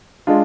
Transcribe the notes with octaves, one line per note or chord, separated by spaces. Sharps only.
G#3 D4 F4